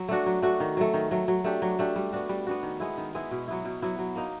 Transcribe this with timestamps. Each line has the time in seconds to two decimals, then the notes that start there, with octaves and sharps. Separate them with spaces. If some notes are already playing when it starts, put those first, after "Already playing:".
Already playing: F#3
0.08 A3 D4 F#4
0.26 F#3
0.42 A3 D4 F#4
0.60 D#3
0.77 F#3 A3
0.94 D#3
1.11 F#3 A3
1.28 F#3
1.44 A3 D4 G4
1.62 F#3
1.79 A3 D4 G4
1.96 G3
2.13 B3 D4 F#4
2.29 G3
2.47 B3 D4 F#4
2.63 D#3
2.80 G#3 B3 E4
2.98 D#3
3.15 G#3 B3 E4
3.31 B2
3.48 F#3 B3 E4
3.65 B2
3.82 F#3 B3 E4
3.99 F#3
4.16 A#3 D#4